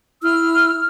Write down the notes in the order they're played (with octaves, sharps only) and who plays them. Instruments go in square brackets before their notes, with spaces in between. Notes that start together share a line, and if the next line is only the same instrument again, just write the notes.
[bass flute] E4 [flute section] E6 F6